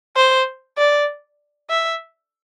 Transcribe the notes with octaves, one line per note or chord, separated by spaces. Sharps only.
C5
D5
E5